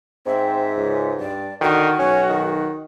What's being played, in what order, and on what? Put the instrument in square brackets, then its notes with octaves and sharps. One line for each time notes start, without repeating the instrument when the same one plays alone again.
[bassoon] G#2 [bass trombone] C4 [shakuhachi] E5
[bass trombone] C#2
[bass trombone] G2 [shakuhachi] D5
[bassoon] D3 [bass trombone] D#3 [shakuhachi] F#4
[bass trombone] B1 [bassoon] C#4
[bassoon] D#3